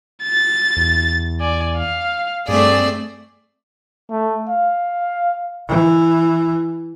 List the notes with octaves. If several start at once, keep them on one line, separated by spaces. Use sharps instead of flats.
A6
E2
D5 G#5
F5
G2 A3 C4 G#4 D5
A3
F5
E3